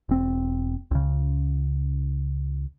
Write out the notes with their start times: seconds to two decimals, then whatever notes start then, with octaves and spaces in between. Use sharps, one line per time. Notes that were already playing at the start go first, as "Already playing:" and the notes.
0.09 E1 C4
0.91 C#2 C#3